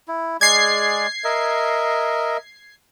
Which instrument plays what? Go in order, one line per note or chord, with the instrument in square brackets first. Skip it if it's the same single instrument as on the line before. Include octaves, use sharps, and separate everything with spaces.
[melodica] E4
[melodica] G#3 G#4 D5 [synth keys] G#6 C7
[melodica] A#4 D#5 E5